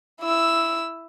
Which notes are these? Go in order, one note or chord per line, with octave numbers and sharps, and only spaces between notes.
E4 E6